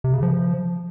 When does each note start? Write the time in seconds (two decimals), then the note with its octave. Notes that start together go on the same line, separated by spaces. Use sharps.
0.04 C3
0.13 C#3
0.23 F3